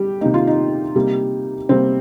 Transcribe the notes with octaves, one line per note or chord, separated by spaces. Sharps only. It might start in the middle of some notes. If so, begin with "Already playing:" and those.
Already playing: G3 G4
C3 D#3 A#3 D#4
F4
D#4
C3 G3 A#3
C3 G3 A#3 C4